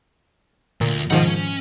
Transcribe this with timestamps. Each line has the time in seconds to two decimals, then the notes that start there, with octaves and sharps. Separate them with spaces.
0.81 D2 A#2
1.10 G#2 B2 D#3 F3 F#5
1.26 C#4